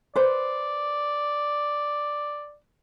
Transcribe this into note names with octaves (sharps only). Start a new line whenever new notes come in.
B4 C5 D5